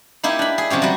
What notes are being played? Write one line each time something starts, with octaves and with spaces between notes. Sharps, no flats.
A#3 D#4 E4 G4
D4 B5
G#4
C3 F3 C#4 G4
F#3 G3